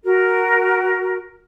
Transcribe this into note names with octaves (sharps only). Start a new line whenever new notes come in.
F#4 A#4